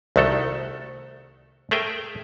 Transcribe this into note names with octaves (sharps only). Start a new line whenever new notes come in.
C2 D#3 A3 F#4 A4
A3 G#4 A#4 E5 G5 G#5